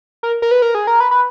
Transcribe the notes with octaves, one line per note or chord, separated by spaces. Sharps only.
A#4
A#4
B4
A#4
G#4
A#4
B4
B4